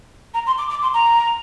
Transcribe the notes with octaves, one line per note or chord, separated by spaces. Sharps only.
A#5
C6
D6
D6
C6
A#5